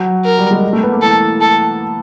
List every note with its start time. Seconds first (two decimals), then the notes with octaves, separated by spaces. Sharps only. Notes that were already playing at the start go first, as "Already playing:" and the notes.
Already playing: F#3
0.25 A#4
0.38 G3
0.51 G#3
0.73 A3
0.83 B3
0.92 A#3
1.02 E3 A4
1.41 A4